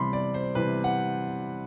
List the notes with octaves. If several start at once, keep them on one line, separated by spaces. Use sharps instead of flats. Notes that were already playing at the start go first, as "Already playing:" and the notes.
Already playing: C3 E3 G3 B5 C6
D5
C5
C3 E3 G3 B4
F#5